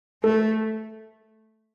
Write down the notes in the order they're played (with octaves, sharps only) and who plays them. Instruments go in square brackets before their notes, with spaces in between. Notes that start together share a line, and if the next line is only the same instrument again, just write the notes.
[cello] A3 [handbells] A4